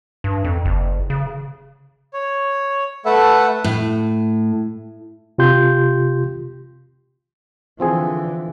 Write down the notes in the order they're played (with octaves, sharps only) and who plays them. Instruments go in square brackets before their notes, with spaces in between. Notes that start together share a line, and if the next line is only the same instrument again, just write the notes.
[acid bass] G2
F2
F#1
C#3
[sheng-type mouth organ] C#5
A3 A4 B4 E5 F#5
[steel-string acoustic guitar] A2
[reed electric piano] C3 F4 G4 C6 G6
[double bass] D3 E3 [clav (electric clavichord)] F3 C4 G#4